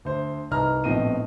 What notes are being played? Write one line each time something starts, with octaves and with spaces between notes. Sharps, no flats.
D2 C5
C2 D#4 B4 A#5 F6
A#1 A2 B3 C4 D#5 D#7